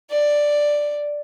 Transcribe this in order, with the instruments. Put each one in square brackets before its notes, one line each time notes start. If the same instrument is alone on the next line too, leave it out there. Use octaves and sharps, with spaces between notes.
[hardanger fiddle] D5